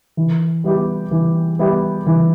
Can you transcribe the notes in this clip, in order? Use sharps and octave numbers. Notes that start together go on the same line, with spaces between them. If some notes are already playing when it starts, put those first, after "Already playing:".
E3
G3 B3 E4 G4
E3
G3 B3 E4 G4
E3